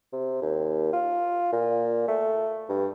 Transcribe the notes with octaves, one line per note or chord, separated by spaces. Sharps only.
C3
D#2
F4
A#2
A3
G2